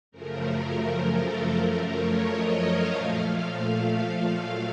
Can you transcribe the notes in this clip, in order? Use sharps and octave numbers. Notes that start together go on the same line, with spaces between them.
F#2 C#3 F3 A3 A#4
A#4
A#4
A4
F#2 F3 A3 A#4
C#5
D#5
F5
A#2 F3 A3
F5
A#2 F#3 A3